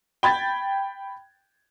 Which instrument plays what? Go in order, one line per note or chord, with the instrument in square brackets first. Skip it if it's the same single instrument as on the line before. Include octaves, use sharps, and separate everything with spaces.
[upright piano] G5 B5 G#6 A6